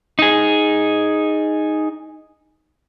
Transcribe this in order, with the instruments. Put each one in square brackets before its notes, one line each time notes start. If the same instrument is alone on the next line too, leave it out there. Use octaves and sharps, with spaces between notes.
[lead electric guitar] D#4 G#4